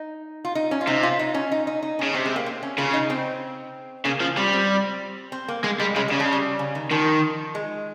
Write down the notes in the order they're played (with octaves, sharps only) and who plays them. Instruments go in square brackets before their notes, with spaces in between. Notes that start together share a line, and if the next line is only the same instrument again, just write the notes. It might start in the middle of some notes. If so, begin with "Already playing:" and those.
Already playing: [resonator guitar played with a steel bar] D#4
F4
D#4
C#4
F4
[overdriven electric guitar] C3 [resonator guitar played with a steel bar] D#4
[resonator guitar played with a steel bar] F4
D#4
C#4
D#4
D#4
D#4
[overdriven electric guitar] C#3 [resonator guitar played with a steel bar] C#4
[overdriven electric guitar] C3 [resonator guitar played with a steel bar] C4
[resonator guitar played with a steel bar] G#3
A#3
C4
C#4
[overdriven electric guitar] C#3 [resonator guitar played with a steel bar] F4
[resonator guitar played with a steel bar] D#4
C4
[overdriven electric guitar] C#3 [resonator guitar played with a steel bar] A#3
[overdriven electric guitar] F3
[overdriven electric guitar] G3 [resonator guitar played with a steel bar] C4
[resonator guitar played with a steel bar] C4
C4
A#3
[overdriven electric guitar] G#3 [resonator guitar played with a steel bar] A#3
[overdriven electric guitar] G3 [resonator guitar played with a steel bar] G#3
[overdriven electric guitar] C#3 [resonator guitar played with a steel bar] G#3
[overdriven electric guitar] C#3 [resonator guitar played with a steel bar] G3
[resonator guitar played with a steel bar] F3
G3
C#3
D#3
[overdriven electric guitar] D#3 [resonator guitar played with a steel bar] F3
[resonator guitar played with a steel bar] G#3